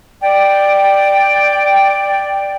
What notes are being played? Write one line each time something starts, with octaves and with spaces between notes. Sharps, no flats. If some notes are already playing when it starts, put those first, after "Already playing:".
D5 G5